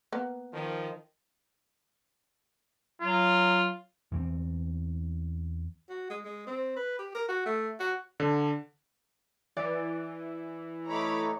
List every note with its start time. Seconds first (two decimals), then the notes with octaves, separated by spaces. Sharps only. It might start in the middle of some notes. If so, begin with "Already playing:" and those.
0.12 A#3 B3
0.53 D#3 F3
3.02 F#3 F4
4.11 E2 E3 F#3 C4
5.89 F#4
6.10 G#3
6.25 G#3
6.47 C4
6.76 B4
6.99 G4
7.15 A#4
7.28 F#4
7.46 A3
7.80 F#4
8.20 D3
9.57 E3 D5
10.87 A3 D#4 C#5 A#5 B5 D6